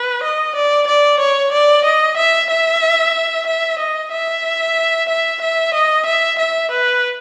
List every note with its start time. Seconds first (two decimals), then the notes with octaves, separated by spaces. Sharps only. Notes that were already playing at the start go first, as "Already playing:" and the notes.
Already playing: B4
0.23 D#5
0.55 D5
0.87 D5
1.20 C#5
1.52 D5
1.85 D#5
2.17 E5
2.50 E5
3.47 E5
3.79 D#5
4.12 E5
5.09 E5
5.41 E5
5.74 D#5
6.06 E5
6.39 E5
6.71 B4